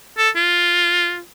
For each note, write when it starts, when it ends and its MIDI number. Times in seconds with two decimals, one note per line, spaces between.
0.18 0.29 69
0.36 1.20 65